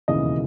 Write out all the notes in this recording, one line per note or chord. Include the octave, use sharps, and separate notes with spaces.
E1 D#2 C#3 E3 D#5